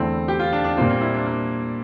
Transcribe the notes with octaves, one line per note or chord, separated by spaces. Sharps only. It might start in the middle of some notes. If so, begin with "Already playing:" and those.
Already playing: E2 D3 A3 C4 E4
G4
F4
D4
D4
A#2 G3 A#3 C4 F4
A#3
E4
D4
A#3